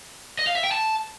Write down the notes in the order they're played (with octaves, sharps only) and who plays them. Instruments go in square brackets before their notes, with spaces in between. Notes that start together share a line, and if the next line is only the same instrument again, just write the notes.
[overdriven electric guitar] D#5
F5
E5
G5
A5